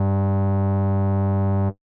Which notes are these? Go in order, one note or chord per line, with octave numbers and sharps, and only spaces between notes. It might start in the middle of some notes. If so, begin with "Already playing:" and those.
Already playing: G2